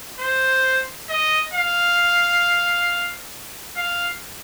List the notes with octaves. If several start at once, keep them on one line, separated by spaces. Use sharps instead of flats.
C5
D#5
F5
F5